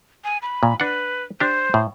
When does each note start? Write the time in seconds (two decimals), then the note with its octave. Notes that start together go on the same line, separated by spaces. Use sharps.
0.24 G#5
0.42 B5
0.63 A#2
0.80 D4 B4 F#5
1.40 D4 G4 C5
1.74 A2